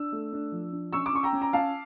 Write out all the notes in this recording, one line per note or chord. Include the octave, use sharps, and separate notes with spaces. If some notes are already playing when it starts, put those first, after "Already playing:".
Already playing: D4 E6
A3
D4
F3
D4
C#4 C#6 E6
D6
C#4 C#6
G5 A#5
C#4
A#5
C#4 F5 A5